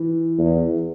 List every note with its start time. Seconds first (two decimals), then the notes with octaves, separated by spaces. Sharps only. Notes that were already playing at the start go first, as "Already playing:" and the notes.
Already playing: E3
0.39 E2